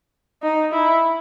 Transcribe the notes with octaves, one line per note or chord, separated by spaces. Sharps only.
D#4
E4